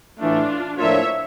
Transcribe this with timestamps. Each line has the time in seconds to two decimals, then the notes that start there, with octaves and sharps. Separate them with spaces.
0.20 A2 E3 A3 D4 F4
0.78 A2 F3 A#3 D4 F4 C#5 E5